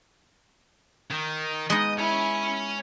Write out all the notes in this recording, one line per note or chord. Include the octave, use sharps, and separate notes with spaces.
D#3
G#3 B3 D#4 D#5
E4 C#5 G#5